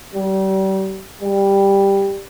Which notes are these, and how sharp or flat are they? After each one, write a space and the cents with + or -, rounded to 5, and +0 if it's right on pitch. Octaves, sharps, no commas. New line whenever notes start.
G3 -35
G3 +5